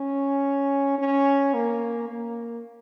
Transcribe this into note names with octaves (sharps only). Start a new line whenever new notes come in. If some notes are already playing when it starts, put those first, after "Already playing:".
Already playing: C#4
C#4
A#3
A#3